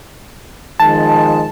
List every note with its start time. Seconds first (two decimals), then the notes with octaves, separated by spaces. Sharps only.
0.80 D#3 F3 G#3 A5